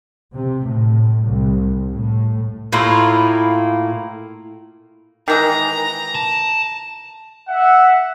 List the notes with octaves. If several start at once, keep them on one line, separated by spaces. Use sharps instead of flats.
C3
A2
C2
A2
A2 A#3 E4 F4
D#3 E3 G#3 A#5
A5
E5 F#5